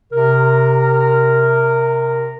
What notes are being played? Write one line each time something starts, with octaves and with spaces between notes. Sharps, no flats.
C3 A#4